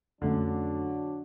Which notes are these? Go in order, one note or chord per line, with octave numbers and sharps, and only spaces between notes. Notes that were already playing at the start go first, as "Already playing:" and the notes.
F2 D3 F#3 A3 C#4 D4